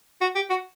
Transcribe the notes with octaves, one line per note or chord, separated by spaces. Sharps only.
F#4
G4
F#4